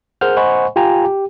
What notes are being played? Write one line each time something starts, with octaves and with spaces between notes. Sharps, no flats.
G#4 A#4 C5 F#5 F6 G6
C5 D#5 F#5 G#5 B5 C#6
F4 G4 G5 G#5 A#5
G4